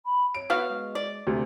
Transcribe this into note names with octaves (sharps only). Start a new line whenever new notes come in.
B5
C#5 D7
B3 F#4 F5
G#3
D5
D2 C3